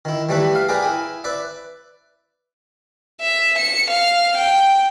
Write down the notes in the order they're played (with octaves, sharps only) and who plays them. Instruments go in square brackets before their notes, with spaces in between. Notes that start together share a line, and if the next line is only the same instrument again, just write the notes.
[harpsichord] D#3 E4
E3 G3 A3 E4 B4
F5
G#4 A#4 B4 D5 G5
E4 G#5
B4 D5 E5
[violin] E5
C#7
F5
G5